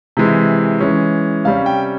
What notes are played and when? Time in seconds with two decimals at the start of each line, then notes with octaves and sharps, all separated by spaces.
0.17 C3 E3 G#3
0.81 E3 G#3 C#4
1.45 C3 G3 C#4 F5
1.66 G5